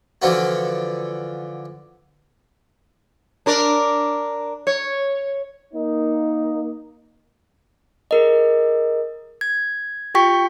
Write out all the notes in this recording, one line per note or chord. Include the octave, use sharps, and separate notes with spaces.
D3 E3 F3 F4 F#4
D4 A#4 D5
C#5
A#3 D#4
G#4 A#4 D#5
G#6
F4 G4 G5 C#6 B6